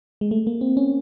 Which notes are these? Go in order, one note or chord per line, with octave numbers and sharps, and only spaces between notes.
G#3
A3
A#3
C4
C#4